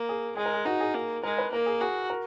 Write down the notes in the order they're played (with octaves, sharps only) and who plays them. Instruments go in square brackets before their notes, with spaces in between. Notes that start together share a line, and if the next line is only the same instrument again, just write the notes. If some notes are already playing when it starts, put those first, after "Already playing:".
Already playing: [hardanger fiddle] A#3
[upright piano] G#4
[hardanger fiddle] G#3 [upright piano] G#4
[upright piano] A#4
G#4
[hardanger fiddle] D#4 [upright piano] F#4
[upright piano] G#4
[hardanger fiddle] A#3
[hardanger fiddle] G#3 [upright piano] A#4
[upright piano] B4
[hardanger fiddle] A#3 [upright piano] A#4
[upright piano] G#4
[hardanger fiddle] F#4 [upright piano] G#4
[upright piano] A#4